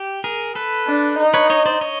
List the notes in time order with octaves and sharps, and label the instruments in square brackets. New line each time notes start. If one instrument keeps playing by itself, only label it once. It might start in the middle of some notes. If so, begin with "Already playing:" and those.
Already playing: [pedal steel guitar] G4
G#4 A#4
A4 B4
[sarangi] D4
D#4
[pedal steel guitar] B4 C#5
C#5 D#5
C5 D5
C#5 D#5